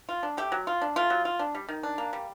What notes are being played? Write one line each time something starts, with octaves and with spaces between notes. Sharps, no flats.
F4
D4
A3 G4
F#3
F4
D4
A3 F4
F#3
F4
D4
G3
D#3
D4
A#3
G3